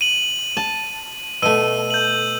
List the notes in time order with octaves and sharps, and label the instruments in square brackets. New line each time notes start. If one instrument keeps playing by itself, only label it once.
[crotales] D#7 F#7
[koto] A5
[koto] B2 A3 [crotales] E6 D#7
[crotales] G6 F#7